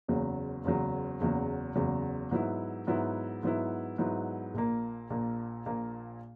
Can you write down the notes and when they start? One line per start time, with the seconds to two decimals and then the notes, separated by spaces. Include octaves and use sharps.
0.08 F#1 E2 C#3 F#3
0.64 F#1 E2 C#3 F#3
1.20 F#1 E2 C#3 F#3
1.76 F#1 E2 C#3 F#3
2.31 G#2 F#3 B3 E4
2.87 G#2 F#3 B3 E4
3.43 G#2 F#3 B3 E4
3.98 G#2 F#3 B3 E4
4.54 A#1 A#2 A#3
5.10 A#1 A#2 A#3
5.66 A#1 A#2 A#3